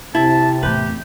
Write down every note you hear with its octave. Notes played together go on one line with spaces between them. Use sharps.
C3 E4 A5
E2 A2 G4 B4